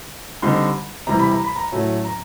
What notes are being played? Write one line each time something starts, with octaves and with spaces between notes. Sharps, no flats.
D3 G3 C4 D#4 C6
C3 E3 G3 A#5
B5
A#5
B5
A#5
A2 F#3 A3 C#4
A#5